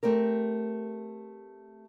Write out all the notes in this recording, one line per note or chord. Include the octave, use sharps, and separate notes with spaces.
A3 C4 G4 A#4